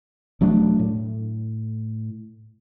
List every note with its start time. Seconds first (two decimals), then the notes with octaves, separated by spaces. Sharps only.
0.41 E1 F#3 A3 D4
0.79 A2